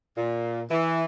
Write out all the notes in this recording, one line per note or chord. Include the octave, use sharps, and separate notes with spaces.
A#2
E3